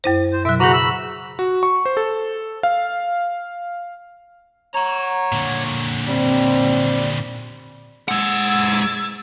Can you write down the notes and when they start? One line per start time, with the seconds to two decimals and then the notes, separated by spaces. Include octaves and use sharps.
0.04 F#2 E4 C5
0.32 C5
0.45 B2 F#3 E5
0.60 C#3 F#4 G#4 A#5 B5
0.73 B5 E6
1.39 F#4
1.63 C#6
1.86 C5
1.97 A4
2.63 F5
4.74 C#5 F#5 A#5
5.32 A#2 D3
6.07 D#2 G3 C4
8.08 G#3 F#5 E6 G#6 A6